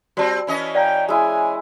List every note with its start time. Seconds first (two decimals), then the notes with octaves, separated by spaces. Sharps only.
0.17 G3 C4 F#4 D5 A5
0.47 E3 C#4 D#5
0.75 D5 F5 G5 A#5
1.08 G#3 E4 G#5